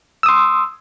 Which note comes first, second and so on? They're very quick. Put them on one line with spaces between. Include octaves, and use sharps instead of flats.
E6 D#6 C6